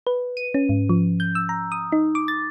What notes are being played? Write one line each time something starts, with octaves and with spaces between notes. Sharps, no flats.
B4
D#7
C#4
G#2
F3
G6
E6
A#5
D#6
D#4
D6
A6